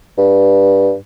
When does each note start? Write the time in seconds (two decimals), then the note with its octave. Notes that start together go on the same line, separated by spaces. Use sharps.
0.18 G2